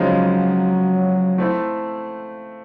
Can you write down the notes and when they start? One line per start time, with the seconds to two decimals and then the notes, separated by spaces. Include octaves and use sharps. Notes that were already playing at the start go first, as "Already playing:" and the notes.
Already playing: C#3 F3 F#3 G#3 C4 D#4
1.38 A3 C4 E4